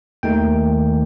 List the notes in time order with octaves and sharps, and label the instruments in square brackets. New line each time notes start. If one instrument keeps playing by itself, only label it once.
[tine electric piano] D#2 D#3 A3 D#4 G5